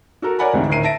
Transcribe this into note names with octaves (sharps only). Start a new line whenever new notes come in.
F#4 A4 A#4
A#4 C#5 D5 F#5 G#5 B5
D2 G#2 C3 D#3 E3
D2 A2 D#3 A#4 C7 D#7
E5 A5 A#6 D7